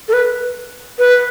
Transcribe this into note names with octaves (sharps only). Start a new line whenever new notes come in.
A4
B4
B4